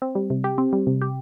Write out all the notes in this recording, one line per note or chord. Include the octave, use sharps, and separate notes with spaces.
C4
G3
C3
G4
C4
G3
C3
G4